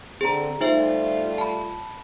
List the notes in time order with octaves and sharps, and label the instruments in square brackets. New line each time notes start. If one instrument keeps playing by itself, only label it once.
[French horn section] D3 C4 [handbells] G#4 A#5
[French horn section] G3 A3 F4 [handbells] D#4 C5 E5
[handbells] A5 B5